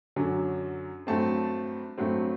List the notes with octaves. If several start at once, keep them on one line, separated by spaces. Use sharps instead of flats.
F#2 D3 F#3
G2 F#3 A3 C4 A5
G2 F#3 A3 C4